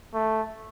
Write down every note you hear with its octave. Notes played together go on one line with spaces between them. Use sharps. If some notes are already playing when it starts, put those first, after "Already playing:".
A3